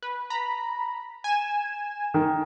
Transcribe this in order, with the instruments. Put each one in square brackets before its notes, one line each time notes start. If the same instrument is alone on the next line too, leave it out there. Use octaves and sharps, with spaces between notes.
[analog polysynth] B4
A#5 B5
G#5 E7
[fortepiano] D#3